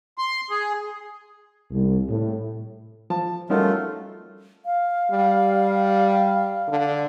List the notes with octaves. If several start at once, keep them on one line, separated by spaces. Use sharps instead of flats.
C6
G#4
C2
A2
F3 A5
G3 A3 C#4 D#4 F4 F#4 A4 A#4
F5
G3
D3